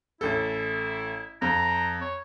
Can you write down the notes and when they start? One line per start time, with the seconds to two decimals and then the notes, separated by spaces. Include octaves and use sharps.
0.21 A1 E4 A4
1.42 F2 A#5
2.01 C#5